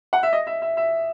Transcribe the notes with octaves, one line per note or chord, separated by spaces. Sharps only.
F#5
E5
D#5
E5
E5
E5